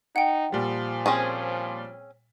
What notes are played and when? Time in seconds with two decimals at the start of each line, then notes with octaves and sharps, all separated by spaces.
0.16 D#4 F#5 G5
0.52 A#2 F3 G3
1.06 C4 C#4 G#4